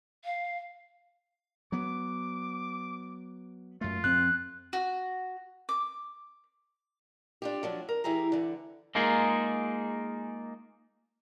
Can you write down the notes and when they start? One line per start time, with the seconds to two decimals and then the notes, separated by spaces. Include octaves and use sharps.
0.24 F5
1.72 F#3 B3 D6
3.81 F#2 A3 F4
4.04 F2 C4 F#6
4.73 F#4
5.69 D6
7.42 D4 F4 G4
7.63 F3 F#3 D4
7.89 A#4
8.04 E3 E4 G4 G#4 A#5
8.32 D3 E3
8.95 G#3 A#3 D#4 F4 G#4